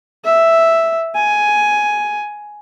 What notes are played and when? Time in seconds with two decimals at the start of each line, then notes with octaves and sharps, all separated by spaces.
0.25 E5
1.15 G#5